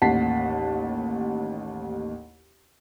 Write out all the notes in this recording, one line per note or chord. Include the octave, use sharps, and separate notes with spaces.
A1 D#2 F#5 A5 B6 C7